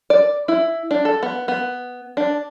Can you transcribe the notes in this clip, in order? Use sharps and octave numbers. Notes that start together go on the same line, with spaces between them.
D5
E4
D4
A4
B3
B3
D4